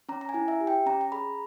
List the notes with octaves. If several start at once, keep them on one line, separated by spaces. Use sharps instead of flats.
C#4 A#5
A#5
G#5
E4
E5
G4
G5
C#4 A#5
A#5
G#4 B5